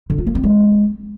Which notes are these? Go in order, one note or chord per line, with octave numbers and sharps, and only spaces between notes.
D3
F4
A#3
C4
G#3